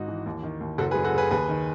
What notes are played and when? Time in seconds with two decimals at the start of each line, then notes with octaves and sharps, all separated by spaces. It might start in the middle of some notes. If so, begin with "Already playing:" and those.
Already playing: G#1 G#2 D#4 F#4
0.08 E3
0.26 D#2
0.43 D#3
0.61 D#2
0.78 F#1 F#4 A4
0.91 G#4 B4
0.95 F#2
1.04 F#4 A4
1.13 C#3 G#4 B4
1.31 D#2 G#4 B4
1.49 D#3